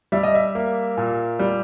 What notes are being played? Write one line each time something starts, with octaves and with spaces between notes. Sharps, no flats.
G3 E5
D#5
E5
A#3
A#2
G3